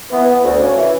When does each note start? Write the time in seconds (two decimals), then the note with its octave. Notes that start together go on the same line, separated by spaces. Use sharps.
0.10 E3 B3
0.27 B3
0.43 D2
0.59 C#3 C#4
0.76 E3